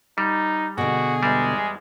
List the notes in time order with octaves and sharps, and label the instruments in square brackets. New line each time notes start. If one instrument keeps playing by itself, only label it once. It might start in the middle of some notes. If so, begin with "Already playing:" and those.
[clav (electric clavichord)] G3 [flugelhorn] D#4
[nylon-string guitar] B2 D3 [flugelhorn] F#4 [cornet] G#4
[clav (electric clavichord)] E2 G3 [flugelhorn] G#3